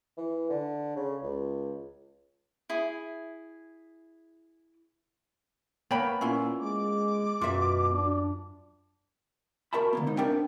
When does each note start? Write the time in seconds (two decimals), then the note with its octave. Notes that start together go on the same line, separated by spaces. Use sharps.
0.17 E3
0.50 D3
0.96 C#3
1.23 C#2
2.70 E4 G#4
5.91 A#3 B3 C#5 G5 B5
6.21 A#2 C#4 E4 F4
6.60 G#3 D6
7.41 F#2 B2 F4 E5
7.94 D4
9.73 F#4 A#4 E5 A5 B5
9.93 D3 A#3 B3
10.07 G#2 D#4
10.18 B3 C4 D4 A#4 E5 G5